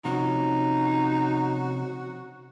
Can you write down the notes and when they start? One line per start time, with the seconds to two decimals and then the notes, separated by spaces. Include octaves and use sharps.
0.05 C3 F3 C#4 D#4 F#4